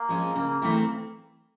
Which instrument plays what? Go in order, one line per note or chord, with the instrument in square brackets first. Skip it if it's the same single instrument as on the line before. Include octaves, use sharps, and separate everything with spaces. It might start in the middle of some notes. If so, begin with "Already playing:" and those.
Already playing: [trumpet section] A#3
[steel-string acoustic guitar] F3 G#3 C#4
[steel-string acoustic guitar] C#3 [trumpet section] A#3
[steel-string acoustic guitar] E3 A3 C4 E4